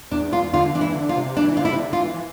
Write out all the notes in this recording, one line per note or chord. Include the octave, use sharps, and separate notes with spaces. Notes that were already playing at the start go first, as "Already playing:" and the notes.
E2 D4
F4
D3 F4
E3 D4
E4
D3
F4
C3
E3 D4
D3 F4
E4
C3
D3
F4
E3
E3